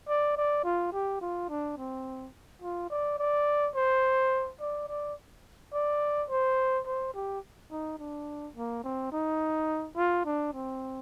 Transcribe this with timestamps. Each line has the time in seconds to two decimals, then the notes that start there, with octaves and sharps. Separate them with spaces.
0.09 D5
0.37 D5
0.64 F4
0.93 G4
1.22 F4
1.50 D4
1.78 C4
2.62 F4
2.90 D5
3.19 D5
3.75 C5
4.61 D5
4.89 D5
5.74 D5
6.30 C5
6.87 C5
7.14 G4
7.71 D#4
7.99 D4
8.56 A#3
8.84 C4
9.12 D#4
9.97 F4
10.26 D4
10.54 C4